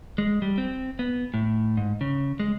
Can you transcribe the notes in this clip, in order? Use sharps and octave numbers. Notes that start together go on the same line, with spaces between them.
G#3
G3
C4
B3
A2
G#2
C#3
G#3